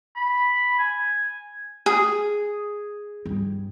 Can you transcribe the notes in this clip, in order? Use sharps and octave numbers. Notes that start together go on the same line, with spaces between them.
B5
G#5
G#4
G2